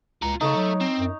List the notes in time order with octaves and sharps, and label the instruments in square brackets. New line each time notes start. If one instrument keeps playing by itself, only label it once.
[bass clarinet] C#2 [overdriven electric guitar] F4 A#5
[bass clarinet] C#3 [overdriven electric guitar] A3 A4 [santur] D#4 C#5
[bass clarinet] F#3
[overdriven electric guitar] C4
[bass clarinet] F#2